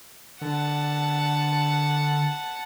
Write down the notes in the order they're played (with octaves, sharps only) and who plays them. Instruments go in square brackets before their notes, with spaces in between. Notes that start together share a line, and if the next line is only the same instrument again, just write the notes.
[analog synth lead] D3 [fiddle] F#5 A5